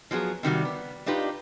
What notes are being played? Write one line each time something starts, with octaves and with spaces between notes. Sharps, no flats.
F3 F#3 B3 G#4
C3 D#3 G3 F#4
B3
D4 D#4 F4 G4 B4